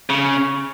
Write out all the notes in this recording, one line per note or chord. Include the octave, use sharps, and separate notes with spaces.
C#3